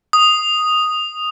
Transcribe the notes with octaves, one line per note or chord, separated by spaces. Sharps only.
D#6